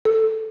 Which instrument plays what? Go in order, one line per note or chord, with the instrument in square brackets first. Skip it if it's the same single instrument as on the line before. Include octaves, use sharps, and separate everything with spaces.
[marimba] A4